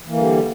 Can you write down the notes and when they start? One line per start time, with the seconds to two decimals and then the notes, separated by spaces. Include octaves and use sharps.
0.05 E3
0.09 A#3
0.13 D3
0.17 G3